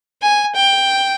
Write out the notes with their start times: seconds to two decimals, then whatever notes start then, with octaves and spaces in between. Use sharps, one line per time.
0.22 G#5
0.55 G5